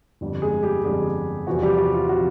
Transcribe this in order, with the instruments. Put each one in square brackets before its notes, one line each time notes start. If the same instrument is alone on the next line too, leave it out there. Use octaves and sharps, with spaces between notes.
[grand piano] G1 F2 D3 G3
G#3 G#4
G3 G4
G1 F2 D3 G3 G#3 G#4
E2 C3 F3 F#4
G3 G4
F#4
F4
C3 F3 F#4